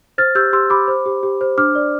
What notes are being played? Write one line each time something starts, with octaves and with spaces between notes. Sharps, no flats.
C5 F6 A6
G4 E6 G6
G4 C6 E6
G4 B5 D6
C5
G4
G4
C5
D4 D6 F6
D5